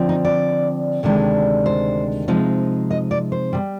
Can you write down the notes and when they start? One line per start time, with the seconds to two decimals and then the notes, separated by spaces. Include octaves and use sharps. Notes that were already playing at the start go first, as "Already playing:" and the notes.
Already playing: D3 F3 C4
0.09 D#4
0.25 D5
1.03 D2 C3 D#3 G#3 D4
1.66 C5
2.28 C3 F3 G#3 C4 D#4
2.91 D#5
3.11 D5
3.32 C5
3.53 C3 G3